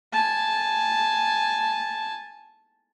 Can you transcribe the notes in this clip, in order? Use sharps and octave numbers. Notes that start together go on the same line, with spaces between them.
G#5 A5